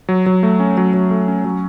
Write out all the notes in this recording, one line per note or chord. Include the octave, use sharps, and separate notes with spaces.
F#3
F#3
A3
C#4
F#3
F#3
A3
C#4
F#3